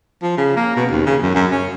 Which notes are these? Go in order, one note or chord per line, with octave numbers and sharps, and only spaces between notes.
F3
C#3
A#3
B2
D#2
C#3
F#2
F#2
C#4